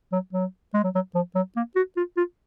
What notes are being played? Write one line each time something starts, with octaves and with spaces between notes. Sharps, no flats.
F#3
F#3
G#3
F#3
F#3
F3
F#3
A#3
F#4
F4
F4